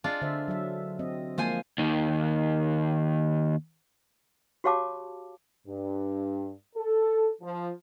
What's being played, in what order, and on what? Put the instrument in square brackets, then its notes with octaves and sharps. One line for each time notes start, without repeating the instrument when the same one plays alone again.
[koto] G#3 D4 F4
[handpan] D3 C5 E5
F#3 A4 E5
C4 D#5
[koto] F3 C5 G#5 [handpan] G#3 A#3 F4
[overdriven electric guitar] D#2 D#3
[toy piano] F#4 G4 C#5 F5 A5 D6
[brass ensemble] G2
A4
F3